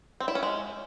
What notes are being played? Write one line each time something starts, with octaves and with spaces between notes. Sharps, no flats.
C4
E4
C#4
G#3